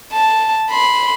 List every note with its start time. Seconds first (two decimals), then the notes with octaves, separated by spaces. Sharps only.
0.13 A5
0.71 B5 C6